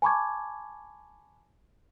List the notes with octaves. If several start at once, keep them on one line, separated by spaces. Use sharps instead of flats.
G#5 A5 B5 C#6 D6 G#6